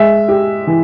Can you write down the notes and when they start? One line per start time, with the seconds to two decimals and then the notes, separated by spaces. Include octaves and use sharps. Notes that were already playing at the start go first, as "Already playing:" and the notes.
Already playing: G#3 E5
0.28 G4
0.67 E3